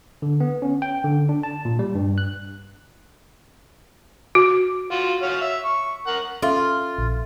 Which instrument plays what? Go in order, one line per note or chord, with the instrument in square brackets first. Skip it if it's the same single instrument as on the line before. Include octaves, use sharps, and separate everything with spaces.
[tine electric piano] D3
B3
C#4
G5
D3
D4
A5
A#2
G3
G2
F#6
[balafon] F#4
[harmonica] F4 F#4
F#4 C#5 F5
E5
C#6
A#4 F#5
[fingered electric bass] C#4 [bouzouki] F4 [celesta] A4 E5 C6
[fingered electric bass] A#1